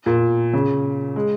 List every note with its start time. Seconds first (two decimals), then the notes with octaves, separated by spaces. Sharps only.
0.06 A#2
0.53 C#3
1.16 G#3